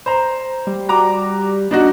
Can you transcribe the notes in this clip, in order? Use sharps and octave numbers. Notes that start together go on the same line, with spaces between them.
C5 A#5
G3
F#4 A#5 D6
D4 D#4 F#4